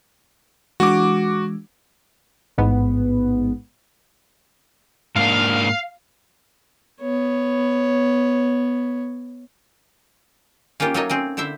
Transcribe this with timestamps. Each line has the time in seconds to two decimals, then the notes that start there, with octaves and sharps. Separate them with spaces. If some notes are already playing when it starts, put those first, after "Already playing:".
0.80 E3 G#3 D4 F#4 D6
2.58 A1 G#2 B3
5.16 G#2 A#3 D4 F5
7.01 B3 C#5
10.80 A#3 C#4 D#4 F4 G4
10.94 F#3 A3 A#3 D#4 C#5 D#5
11.09 C4 C#4 D#5
11.37 D3 E4 C5 E5